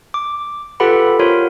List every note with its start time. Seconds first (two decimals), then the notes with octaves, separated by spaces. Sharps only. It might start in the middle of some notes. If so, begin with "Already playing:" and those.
0.14 D6
0.80 F4 G4 A4 B4 F#5 B5
1.20 F4 A#4 C5 C#5